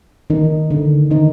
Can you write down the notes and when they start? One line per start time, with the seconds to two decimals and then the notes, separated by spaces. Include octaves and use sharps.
0.30 D#3 D#4
0.71 D3 D4
1.10 D#3 D#4